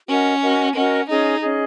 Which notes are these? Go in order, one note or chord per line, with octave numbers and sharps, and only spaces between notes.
C#4 F#4 A#4 D#5 F#5
F#4 A#4 D#5 F#5
C#4 F#4 A#4 D#5 F#5
C#4 D#4 G#4 D#5
C#4 G#4 D#5